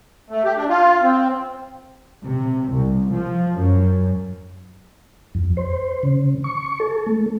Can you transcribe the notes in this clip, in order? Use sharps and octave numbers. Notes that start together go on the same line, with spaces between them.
A3
G4
D4
F4
C4
C3
C2
F3
F#2
F2
C5
C#3
C#6
A4
A3